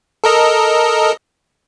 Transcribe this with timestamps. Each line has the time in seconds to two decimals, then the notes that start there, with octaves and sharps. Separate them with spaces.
0.24 A4 A#4 D#5